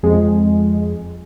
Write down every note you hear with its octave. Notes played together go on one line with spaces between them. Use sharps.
F2 G#3